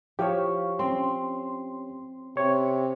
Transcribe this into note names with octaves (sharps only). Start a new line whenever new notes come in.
F3 E4 G4 C#5 F5 C#6
C4 C#4 C6
C3 C#5